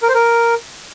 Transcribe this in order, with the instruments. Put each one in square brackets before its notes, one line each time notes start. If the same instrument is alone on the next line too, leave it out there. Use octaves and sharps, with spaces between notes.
[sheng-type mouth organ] A#4
C5
A#4